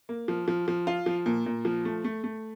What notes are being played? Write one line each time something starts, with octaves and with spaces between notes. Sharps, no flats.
A#3
F3
F3
F3
F4
F3
A#2
A#2
F3
A3
A3
A3